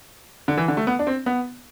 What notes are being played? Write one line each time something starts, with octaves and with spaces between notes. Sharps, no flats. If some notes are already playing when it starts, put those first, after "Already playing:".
D3
E3
D3
A3
B3
D4
C4
B3